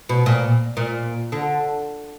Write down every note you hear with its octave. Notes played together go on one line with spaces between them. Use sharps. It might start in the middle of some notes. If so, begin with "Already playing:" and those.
B2
A#2
A#2
D3